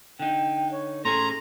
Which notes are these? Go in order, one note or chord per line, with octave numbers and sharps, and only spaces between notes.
D3 D#4 G5
C#5
A2 C#4 G#4 A4 A#5 C6